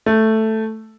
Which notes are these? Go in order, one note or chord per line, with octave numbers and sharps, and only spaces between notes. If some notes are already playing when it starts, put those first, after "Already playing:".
A3